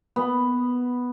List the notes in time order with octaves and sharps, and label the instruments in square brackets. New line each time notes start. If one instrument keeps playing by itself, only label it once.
[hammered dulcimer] B3